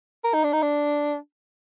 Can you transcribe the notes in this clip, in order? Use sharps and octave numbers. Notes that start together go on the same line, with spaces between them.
A#4
D#4
D4
D#4
D4